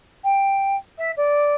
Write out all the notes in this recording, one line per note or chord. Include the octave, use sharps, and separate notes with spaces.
G5
E5
D5